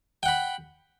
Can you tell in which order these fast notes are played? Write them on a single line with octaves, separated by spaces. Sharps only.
G5 F#5 B5